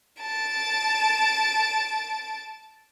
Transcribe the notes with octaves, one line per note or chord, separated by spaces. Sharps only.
A5 D7